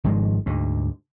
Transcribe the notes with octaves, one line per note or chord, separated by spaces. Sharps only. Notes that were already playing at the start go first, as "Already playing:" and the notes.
G#1 G#2 F3 G#3
D2 G#2